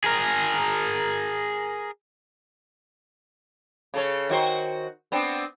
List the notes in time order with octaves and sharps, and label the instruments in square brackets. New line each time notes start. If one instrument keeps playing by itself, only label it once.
[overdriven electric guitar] G#4 A#4
[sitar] C#3 A4 C#5
D#3 F#4 C5
B3 C4 D4